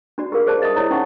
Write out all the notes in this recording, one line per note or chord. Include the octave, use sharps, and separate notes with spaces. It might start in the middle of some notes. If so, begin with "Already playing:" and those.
D4 F#4 D5
G4 G#4 A#4 F5
G#4 C5 D5 A5
D#5 E5 A5 D#6
E4 C#5 D#5
C#4 D#4 E5 F#5 C#6